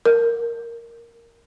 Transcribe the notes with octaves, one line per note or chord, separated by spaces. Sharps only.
A#4